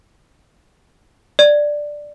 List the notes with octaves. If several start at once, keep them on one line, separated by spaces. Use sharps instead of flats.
D5